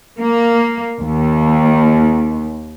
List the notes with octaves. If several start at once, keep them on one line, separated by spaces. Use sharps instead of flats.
A#3
D#2